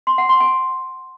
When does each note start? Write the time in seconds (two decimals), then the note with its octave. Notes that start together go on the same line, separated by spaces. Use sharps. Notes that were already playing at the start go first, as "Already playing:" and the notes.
0.07 C6
0.18 F#5
0.29 C6
0.40 G#5